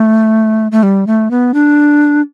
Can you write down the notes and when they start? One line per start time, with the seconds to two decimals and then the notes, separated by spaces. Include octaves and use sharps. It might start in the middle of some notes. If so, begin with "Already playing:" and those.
Already playing: A3
0.72 A3
0.83 G3
1.07 A3
1.31 B3
1.54 D4